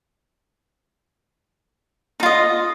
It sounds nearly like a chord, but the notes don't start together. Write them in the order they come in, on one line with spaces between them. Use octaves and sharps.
D#4 F4 D#5